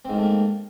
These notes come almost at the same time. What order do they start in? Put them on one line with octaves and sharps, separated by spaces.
C4 G#2 D#3 A3 A#3